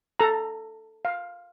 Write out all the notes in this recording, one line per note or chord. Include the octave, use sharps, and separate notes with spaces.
A4 A#5
F5